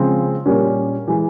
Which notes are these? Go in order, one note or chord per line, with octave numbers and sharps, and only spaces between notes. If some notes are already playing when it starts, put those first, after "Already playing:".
Already playing: C#3 F3 G#3 C4 F4
A#2 G3 A#3 C#4
E3 G#3